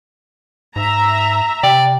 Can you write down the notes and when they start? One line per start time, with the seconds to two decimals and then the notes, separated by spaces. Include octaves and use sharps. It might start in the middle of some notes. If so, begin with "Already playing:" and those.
0.76 G#2 E5 A#5
1.63 C3 D5 G5